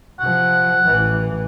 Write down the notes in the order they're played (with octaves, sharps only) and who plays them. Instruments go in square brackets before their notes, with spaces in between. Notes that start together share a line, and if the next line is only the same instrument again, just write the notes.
[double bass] C3 F3 [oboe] F#5
[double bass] A1 E3